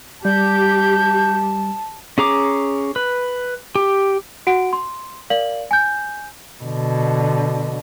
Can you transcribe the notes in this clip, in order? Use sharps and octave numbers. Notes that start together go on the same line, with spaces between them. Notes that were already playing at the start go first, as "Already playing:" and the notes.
G3 G4 A5 G6
C#4 G#4 A#5 D6
B4
G4
F#4 F#5 D7
C6
A#4 D5 F5 F#7
G#5 G6
B2 D3